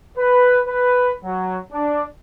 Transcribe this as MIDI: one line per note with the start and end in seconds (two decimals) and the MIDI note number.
0.17 0.59 71
0.67 1.11 71
1.24 1.56 54
1.73 2.02 62